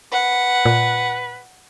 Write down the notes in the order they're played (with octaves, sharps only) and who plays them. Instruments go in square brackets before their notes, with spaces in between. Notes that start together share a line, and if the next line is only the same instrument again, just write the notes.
[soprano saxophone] B4 [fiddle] F#5
[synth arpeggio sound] A#2